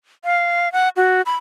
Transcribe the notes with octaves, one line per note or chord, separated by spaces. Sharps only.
F5
F#5
F#4
B5